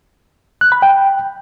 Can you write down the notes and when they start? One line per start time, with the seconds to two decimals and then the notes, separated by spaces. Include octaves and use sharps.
0.61 F#6
0.72 B5
0.82 G5